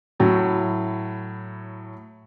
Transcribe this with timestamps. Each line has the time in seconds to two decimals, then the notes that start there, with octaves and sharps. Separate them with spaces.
0.20 A2 F#3 E4